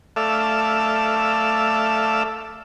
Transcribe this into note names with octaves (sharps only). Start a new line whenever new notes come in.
A3 A4 D5 E5 F5